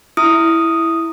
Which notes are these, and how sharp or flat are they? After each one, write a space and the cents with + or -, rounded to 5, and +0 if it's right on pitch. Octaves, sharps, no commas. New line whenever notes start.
E4 +0 D#6 +0